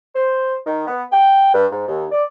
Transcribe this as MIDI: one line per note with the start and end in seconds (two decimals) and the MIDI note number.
0.14 0.54 72
0.66 0.85 51
0.88 1.03 59
1.11 1.53 79
1.54 1.65 43
1.72 1.86 44
1.87 2.05 39
2.11 2.23 74